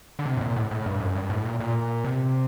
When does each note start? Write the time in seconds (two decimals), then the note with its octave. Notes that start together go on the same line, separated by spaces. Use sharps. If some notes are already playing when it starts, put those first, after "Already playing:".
0.19 D3
0.26 C3
0.37 A2
0.41 A#2
0.56 A2
0.71 A2
0.86 G2
1.00 F#2
1.15 G2
1.30 A2
1.45 A#2
1.60 A#2
2.04 C3